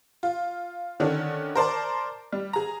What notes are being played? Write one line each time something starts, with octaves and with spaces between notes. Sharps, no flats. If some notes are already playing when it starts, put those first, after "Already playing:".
F4
D3 D#3 C#4 D4
A#4 C5 D5 A5
G3
G#4 A#5